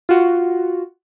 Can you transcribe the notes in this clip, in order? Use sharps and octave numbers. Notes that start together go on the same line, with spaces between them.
F4 F#4